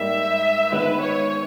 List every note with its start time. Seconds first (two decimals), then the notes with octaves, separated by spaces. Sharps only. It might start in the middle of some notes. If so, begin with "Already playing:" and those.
Already playing: G#2 G3 A#3 D#4 E5
0.72 D#3 G#3 B3 D#4 B4
1.00 C#5